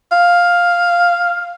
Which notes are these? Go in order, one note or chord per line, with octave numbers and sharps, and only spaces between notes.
F5